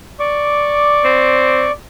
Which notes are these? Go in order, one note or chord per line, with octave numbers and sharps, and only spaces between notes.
D5 C#6 D6
C4